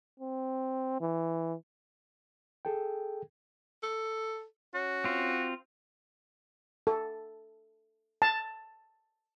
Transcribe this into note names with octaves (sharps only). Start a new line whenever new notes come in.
C4
E3
G#4 A4 G5
A4
C#4 F#4
C4 F4
A4
A5